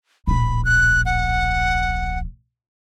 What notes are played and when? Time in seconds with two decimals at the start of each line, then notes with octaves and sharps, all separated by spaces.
0.27 D1 A#1 B5
0.65 F#6
1.06 F#5